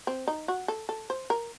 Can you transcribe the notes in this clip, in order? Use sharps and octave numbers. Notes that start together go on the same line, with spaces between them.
C4
D#4
F#4
A4
A4
C5
A#4